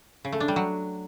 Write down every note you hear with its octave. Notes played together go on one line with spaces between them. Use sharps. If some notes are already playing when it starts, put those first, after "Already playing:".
C#3
A3
D4
G3
F#3